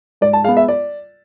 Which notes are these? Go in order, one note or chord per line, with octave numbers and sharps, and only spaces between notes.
G#2 D5
A5
G#3 B3 F5
E5
D5